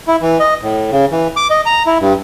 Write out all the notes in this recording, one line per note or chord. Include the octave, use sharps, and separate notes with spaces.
E4
E3
D#5
A2
C#3
E3
D6
D#5
A#5
E4
G2